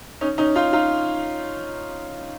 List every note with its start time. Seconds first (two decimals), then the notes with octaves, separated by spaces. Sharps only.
0.21 C#4 D#4
0.38 C#4 D#4
0.56 D#4 F4
0.73 D#4 F4